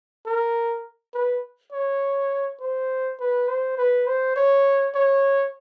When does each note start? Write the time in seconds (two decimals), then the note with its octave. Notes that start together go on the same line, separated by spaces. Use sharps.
0.26 A#4
1.14 B4
1.72 C#5
2.61 C5
3.20 B4
3.48 C5
3.78 B4
4.07 C5
4.36 C#5
4.95 C#5